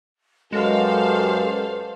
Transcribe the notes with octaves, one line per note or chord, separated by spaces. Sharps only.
F#2 G#3 G4 A4 B4 C5 F5